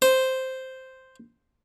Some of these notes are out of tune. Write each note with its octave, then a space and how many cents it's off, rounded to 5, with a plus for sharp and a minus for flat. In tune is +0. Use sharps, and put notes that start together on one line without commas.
C5 -5